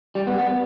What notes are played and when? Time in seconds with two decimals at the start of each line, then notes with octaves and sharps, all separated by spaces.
0.15 G3
0.27 B3
0.38 B3